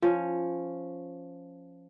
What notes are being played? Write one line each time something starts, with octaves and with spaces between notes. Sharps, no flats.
F3 C#4